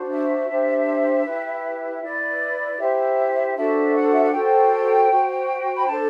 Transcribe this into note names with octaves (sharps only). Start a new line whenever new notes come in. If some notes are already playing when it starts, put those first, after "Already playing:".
Already playing: D4 F#4 C5
E5
D4 G4 C5
E4 G4 B4
E4 B4 D5
E4 G4 C5 E5
D4 F#4 A4 C5 E5
F#5
E5
F#5
F#4 A4 C5 G5
F#4 C5
B5
D4 A4 C5 A5